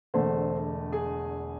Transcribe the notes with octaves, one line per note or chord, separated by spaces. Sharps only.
E1 E2 D3 A3 C4 C5
G#4 G#5